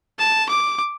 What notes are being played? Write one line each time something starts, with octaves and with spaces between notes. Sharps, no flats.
A5
D6